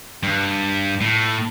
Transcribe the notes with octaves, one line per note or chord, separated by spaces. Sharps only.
G2
A2